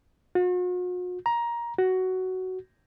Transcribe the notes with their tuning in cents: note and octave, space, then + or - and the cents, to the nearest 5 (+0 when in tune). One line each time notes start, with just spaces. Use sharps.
F#4 -45
A#5 +15
F#4 +10